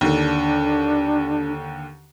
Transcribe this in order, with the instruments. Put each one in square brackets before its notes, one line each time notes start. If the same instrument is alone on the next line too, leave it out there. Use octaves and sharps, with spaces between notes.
[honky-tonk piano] D#2 D3 [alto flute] D4